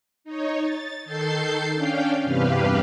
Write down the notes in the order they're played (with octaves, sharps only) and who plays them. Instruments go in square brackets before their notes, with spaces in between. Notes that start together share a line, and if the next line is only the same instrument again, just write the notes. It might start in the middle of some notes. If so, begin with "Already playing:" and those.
[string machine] D#4 C#5
A6
D#3 A4 G6 A6 C7
C#4 D4 F5 G5
E2 G2 C3 G4 B4 F5